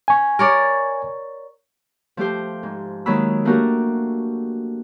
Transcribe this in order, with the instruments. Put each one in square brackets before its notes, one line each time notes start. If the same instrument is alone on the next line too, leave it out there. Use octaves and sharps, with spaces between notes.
[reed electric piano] G#5 C#6
[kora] A#4 C#5 D5
[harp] F3 A3 G4 C5
G#2
D#3 F#3 G#3 A#3 B5 E6
A3 A#3 D4 F#4 G4 A#4